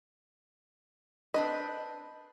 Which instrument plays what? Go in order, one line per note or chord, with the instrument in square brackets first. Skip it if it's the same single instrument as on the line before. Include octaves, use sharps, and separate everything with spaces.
[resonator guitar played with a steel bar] C4 D4 B4 [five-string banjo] D#5